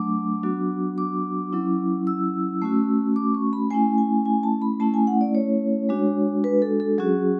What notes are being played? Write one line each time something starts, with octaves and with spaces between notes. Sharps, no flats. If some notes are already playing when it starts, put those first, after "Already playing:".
Already playing: F#3 A3 D4 D6
F#3 B3 D4 F#4
D6
F#3 C#4 E4
E6
A3 C#4 F#4
D6
C#6
B5
A3 C#4 E4 G#5
G#5
G#5
A5
B5
A3 C#4 E4 A5
G#5
F#5
D5
C#5
G#3 D4 F#4
B4
A4
A4
F#3 C#4 F#4 G#4